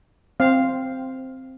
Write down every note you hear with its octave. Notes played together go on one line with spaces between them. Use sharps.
C4 F5